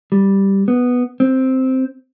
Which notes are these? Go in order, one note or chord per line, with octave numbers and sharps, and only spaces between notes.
G3
B3
C4